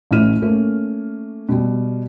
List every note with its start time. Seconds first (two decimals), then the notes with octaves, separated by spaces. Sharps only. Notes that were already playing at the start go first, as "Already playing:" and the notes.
0.11 A1 A2 C#4 E4 F6 D#7
0.42 A3 A#3 C#4
1.49 B2 G3